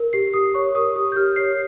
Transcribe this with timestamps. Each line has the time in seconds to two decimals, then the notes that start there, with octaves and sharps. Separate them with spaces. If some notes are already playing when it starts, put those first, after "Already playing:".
Already playing: A#4
0.13 G4 C7
0.34 G4 D#6
0.54 C#5 C#6
0.75 A#4 D#6
0.96 G4 D#6
1.12 G6
1.16 G4 F6
1.36 C#5 C7